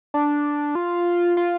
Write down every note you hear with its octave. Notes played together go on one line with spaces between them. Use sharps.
D4
F4
F4